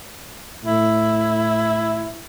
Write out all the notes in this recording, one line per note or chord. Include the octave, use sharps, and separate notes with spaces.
A2 E4